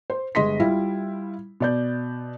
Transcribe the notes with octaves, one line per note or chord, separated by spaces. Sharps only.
C5
G1 G#3 D#5 C6 B6
G3 E4 F4
B2 D5 G6